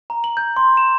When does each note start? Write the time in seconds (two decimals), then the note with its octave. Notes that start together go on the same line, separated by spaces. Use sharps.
0.10 A#5
0.24 F#7
0.37 G6
0.57 C6
0.77 E7